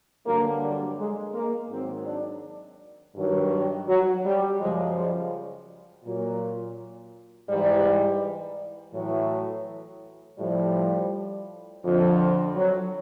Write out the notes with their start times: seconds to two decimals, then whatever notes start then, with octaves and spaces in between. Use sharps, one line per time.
0.26 G2 D3 F#3 A#3
0.62 G3
0.98 G#3
1.34 A#3
1.70 G#2 D#3 F#3 C4
2.06 D4
3.15 G2 D#3 F#3
3.88 F#3
4.24 G3
4.59 F#2 C#3 F3 G#3
4.96 G3
6.04 A#2 F#3
7.49 G#2 E3 G3
8.94 A2 E3 F#3
10.38 A2 F3 G3
11.83 F2 D3 F3
12.56 F#3